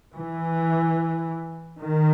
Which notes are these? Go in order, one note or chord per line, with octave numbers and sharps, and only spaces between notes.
E3
D#3